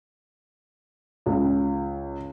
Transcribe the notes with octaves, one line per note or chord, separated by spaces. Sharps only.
C#2